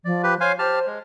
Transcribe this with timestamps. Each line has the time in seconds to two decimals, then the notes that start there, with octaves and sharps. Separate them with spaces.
0.05 F3 D5
0.23 G4 B4
0.40 C5 C#5 F5 G#5
0.59 G4 C5 A5 F6
0.87 G#3